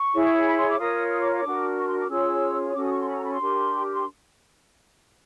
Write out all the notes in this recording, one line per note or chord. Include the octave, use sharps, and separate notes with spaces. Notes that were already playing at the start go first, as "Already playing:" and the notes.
Already playing: C#6
E4 G#4 C#5
B5
C6
D6
F4 A#4 C#5 D#6
D#6
D6
D6
D4 F#4 A#4
C#6
C6
D6
C#4 F4 G#4 C#5 E6
D#6
C#4 F#4 A4 D6
D#6
C#6
C6
B5
A#5
B5
C6
D4 G4 A#4
C6